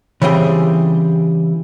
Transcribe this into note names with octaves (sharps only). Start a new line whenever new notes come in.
C#3 E3 G3 C4 G#4 G5